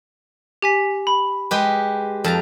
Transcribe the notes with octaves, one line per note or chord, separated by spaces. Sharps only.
G4 G#5 B6
B5
G#3 G4 B4
F2 A5 A#5